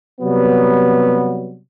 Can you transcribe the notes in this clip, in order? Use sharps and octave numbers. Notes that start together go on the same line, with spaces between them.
C3 F#3 G3 B3